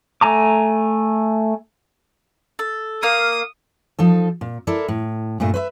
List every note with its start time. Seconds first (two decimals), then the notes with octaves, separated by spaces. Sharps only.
0.21 A3 G#5 A#5 D6
2.59 A4
3.03 A#3 F5 D#6
3.99 F3 D#4 A4
4.41 A#2
4.67 E4 A4 A#4 D5
4.88 A2
5.40 G2 A#2 A3
5.54 B4 C5 E5